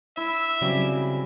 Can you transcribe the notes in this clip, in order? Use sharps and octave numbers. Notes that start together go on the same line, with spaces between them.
E4 E5
C#3 F#3 G3 C4 D6